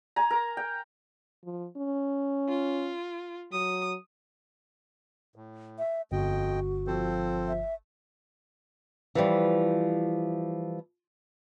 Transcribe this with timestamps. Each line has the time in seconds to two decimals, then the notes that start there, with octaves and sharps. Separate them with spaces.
0.16 G#5 A#5
0.30 A#4
0.57 G5
1.44 F3
1.77 C#4
2.48 F4
3.52 F#3 D#6
5.36 A2
5.78 E5
6.12 G1 F2 F#4 D#5 G5
6.87 F3 C4 A4 C5
7.48 E5
9.15 E3 F3 G3